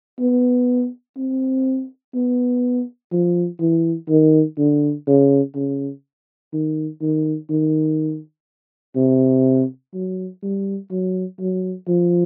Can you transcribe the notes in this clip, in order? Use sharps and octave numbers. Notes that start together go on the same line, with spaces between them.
B3
C4
B3
F3
E3
D#3
D3
C#3
C#3
D#3
D#3
D#3
C3
F#3
G3
F#3
F#3
F3